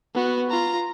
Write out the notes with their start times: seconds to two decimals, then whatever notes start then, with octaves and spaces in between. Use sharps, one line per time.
0.15 B3 F#4
0.50 F4 A#5